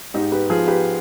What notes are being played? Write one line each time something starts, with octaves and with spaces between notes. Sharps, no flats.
G#2 D#4 G4
G4 B4
F3 F4 G#4
G4 B4